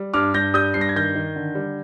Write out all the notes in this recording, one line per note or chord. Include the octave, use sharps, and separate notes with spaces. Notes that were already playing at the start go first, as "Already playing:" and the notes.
Already playing: G3
G2 D6 F6
G2 G6 A#6
G3 D#6 G6
G2 C7
A#6
G#6
D#3 G6 A#6
D#3
D3
G3